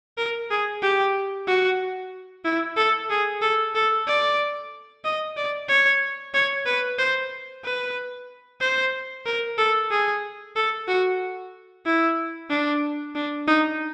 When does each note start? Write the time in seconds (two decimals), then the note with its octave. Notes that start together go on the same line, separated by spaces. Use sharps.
0.18 A#4
0.50 G#4
0.83 G4
1.47 F#4
2.45 E4
2.77 A4
3.10 G#4
3.42 A4
3.75 A4
4.07 D5
5.05 D#5
5.37 D5
5.69 C#5
6.34 C#5
6.66 B4
6.99 C5
7.64 B4
8.61 C5
9.26 A#4
9.58 A4
9.91 G#4
10.56 A4
10.88 F#4
11.86 E4
12.50 D4
13.15 D4
13.48 D#4